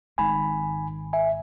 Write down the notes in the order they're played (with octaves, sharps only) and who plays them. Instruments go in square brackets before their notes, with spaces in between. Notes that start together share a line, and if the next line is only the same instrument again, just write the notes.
[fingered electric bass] G#1 G#2 D#3 [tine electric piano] G#5 B5
[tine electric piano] E5 G#5